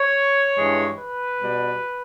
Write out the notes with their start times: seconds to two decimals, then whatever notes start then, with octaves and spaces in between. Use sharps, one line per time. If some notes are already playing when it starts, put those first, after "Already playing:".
Already playing: C#5
0.57 G2 E3 G#3
0.99 B4
1.41 B2 G3